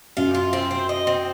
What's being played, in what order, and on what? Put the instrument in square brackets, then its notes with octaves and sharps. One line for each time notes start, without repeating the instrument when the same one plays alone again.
[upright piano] F#2 [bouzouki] F4
[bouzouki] F4
C4
C5
D#5
C4